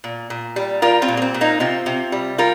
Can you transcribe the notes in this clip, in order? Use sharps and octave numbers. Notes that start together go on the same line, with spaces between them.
A#2
A#2
G3
G3 F4 A#4
C4 F4
A#2
A#3
C4
A#2
A#3 D#4
C3 C4 F4
C3
G3
G3 F4 A#4